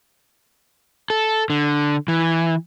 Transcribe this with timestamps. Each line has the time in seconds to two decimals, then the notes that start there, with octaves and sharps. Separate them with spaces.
1.10 A4
1.50 D3
2.08 E3